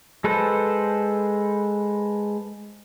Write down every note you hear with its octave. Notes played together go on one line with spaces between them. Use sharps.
G#3 A4 B4 C5